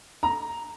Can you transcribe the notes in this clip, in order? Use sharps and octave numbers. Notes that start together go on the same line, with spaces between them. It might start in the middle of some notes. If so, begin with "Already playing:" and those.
A#5